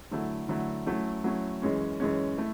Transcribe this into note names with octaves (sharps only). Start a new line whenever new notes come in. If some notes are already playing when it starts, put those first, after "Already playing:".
D3 F#3 A3 E4
D3 F#3 A3 E4
F#3 A3 C#4 E4
F#3 A3 C#4 E4
F#2 E3 G#3 C#4
F#2 E3 G#3 C#4
A3 E4